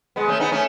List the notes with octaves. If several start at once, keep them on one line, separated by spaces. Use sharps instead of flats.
G#3 B3
A3 C#4
B3 D#4
A3 C#4